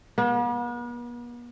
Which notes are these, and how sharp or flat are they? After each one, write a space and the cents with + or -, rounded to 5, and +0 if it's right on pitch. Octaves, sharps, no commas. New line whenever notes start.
B3 -45